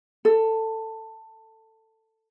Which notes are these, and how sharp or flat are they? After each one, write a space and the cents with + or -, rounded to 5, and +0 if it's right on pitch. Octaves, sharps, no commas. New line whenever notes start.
A4 +15